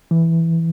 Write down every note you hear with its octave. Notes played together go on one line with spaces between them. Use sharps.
E3